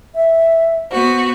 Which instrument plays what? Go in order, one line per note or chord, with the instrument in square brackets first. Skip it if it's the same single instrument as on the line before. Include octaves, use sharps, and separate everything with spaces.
[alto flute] E5
[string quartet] B3 F#4 [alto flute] C5